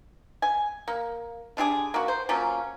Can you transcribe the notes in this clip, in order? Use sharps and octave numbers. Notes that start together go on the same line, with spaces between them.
G#5
A#3
D3 D4 G4 G#4
A#3 F#4
C5
F3 F#3 A#3 C#4